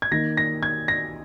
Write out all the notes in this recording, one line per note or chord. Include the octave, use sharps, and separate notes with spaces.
G#6
D#3 A#3 D#4 A#6
A#6
G#6
A#6